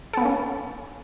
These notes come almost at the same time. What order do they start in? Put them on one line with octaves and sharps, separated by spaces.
A4 B3 A#3 C#4